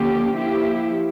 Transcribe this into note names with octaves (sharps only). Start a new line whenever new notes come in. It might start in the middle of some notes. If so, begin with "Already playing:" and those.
Already playing: D3 F3 A#3 C#4 G4
F3 A#3 E4 G4